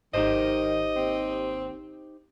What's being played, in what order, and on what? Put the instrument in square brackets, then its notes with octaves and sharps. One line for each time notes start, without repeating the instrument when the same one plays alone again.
[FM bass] G#1 [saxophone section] D#3 [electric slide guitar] D#4 G4 C5 [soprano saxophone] D#5
[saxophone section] D#2 C4